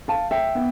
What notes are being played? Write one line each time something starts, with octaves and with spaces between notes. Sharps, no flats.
F5 A5
E5 G5
B3